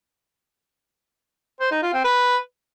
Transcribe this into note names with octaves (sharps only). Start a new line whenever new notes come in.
C5
D#4
F4
C4
B4